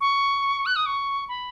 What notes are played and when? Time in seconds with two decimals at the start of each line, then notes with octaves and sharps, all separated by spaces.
0.01 C#6
0.66 F#6
0.76 D#6
0.86 C#6
1.29 B5